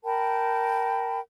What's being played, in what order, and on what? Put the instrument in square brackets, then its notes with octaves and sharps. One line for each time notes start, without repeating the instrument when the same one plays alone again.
[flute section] A#4 G5 A5 B5